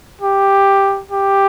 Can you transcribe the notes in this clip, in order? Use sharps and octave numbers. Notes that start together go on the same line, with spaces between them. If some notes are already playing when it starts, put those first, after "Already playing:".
G4
G4